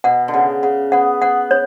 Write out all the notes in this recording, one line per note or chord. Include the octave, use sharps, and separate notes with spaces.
B2 F#5
D3
C#3 F#5
C#3 F#5
B3 F#5
B3 F#5
C#5